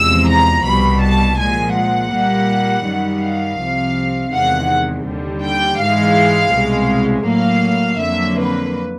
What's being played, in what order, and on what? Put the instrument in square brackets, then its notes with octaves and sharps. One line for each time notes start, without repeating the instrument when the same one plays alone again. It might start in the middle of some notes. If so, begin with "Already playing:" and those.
Already playing: [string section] E2 C3 F3 G#3 E6
A#5
C2 B2 G3 B5
A5
A#2 F3 G#3 G#5
F#5
A#2 G3 A#3
F#2 D#3 G3
F5
C2 C3 F3
E2 C3 D#3 G#3 F#5
D#2 D3 G3
G5
G#2 E3 G#3 F5
C2 B2 G#3
A2 F#3 A#3 F5
F2 D3 F#3 A#3 E5
B4